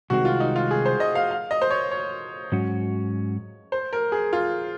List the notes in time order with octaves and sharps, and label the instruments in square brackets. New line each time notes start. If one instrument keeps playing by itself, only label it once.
[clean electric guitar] C2 C3 D#3 G#3 C4 [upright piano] F#4
[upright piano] F4
D#4
F4
G#4
C5
D#5
F5
F5
D#5
C5
C#5
C#5
[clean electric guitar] G#2 F#3 C#4 F#4
[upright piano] C5
A#4
G#4
F4